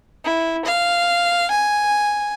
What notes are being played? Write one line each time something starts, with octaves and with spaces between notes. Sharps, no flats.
E4
F5
G#5